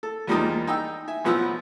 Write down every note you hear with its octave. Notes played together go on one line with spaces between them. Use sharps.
A4
E2 F3 G3 G#3 A#3 D#4
D#4 G5 E6
E5 G#5
B1 B2 F3 B4 F#5 E6